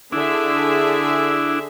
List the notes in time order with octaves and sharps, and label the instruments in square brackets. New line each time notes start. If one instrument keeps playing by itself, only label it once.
[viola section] D3 G#4 E5 [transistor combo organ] D4 E4